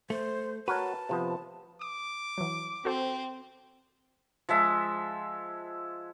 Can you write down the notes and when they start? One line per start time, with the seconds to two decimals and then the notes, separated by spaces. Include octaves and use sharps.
0.10 A3 C5
0.68 F#4 A#4 B4 C#5 A5
1.09 C3 F3 B3
1.81 D6 D#6
2.38 E3 F#3
2.85 C4 F#4 A4 C5
4.49 F3 G#3 E5